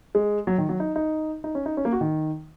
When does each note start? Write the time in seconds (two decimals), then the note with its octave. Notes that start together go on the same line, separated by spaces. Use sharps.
0.15 G#3
0.47 F#3
0.58 D#3
0.69 F#3
0.80 D#4
0.96 D#4
1.44 D#4
1.55 C#4
1.66 D#4
1.77 C#4
1.85 A#3
1.92 F#4
2.01 D#3